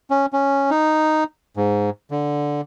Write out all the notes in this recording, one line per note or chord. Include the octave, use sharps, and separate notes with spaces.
C#4
C#4
D#4
G#2
D3